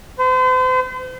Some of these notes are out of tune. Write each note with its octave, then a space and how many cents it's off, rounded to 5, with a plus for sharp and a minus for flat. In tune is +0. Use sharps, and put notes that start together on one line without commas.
C5 -40